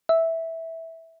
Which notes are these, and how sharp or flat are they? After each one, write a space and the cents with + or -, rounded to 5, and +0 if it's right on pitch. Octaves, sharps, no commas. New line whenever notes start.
E5 -10